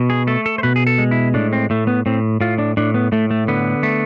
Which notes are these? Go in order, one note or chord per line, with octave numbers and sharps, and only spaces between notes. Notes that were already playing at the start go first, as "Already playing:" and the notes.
Already playing: B2
G#4
A3 A4
A4
C5
B2 B4
G#4
A4
G#3
E4
A2 D4
C4
A2 A3
B3
A2 C4
A2 F4
D4
A2 D4
B3
A2 A3
A3
D3 B3
A3